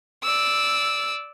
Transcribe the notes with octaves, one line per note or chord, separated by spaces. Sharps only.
D5 E6